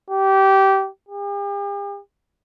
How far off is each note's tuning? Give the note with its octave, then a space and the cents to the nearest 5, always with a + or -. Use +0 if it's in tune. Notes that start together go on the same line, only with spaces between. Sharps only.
G4 -20
G4 +45